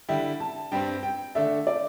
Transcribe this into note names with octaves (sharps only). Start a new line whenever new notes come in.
D3 G3 E4 G5
A5
G2 G3 C4 G5
G5
D3 A3 D4 E5
D5